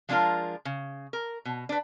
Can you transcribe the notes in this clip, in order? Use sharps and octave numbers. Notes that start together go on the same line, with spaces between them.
F3 G#3 D4 E4 F4 A#4
C#3
A#4
B2
D4 B4